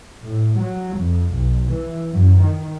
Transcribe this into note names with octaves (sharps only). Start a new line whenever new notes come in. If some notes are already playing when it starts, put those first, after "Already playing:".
A2
F#3
F2
B1
E3
F#2
D#3